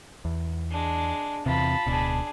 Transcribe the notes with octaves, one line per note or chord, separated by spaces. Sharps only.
E2
G#3 D4
E2 C3 F4 A5 B5
D1 B2 D4 G#4